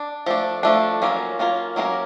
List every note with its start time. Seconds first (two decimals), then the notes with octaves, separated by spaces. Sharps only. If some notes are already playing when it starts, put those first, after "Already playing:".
Already playing: D4
0.26 F3 A3 D4
0.63 F3 A3 D4
1.02 F#3 A#3 C#4 F4 A#4
1.39 F#3 A#3 C#4 F4 A#4
1.76 F#3 A#3 C#4 F4 A#4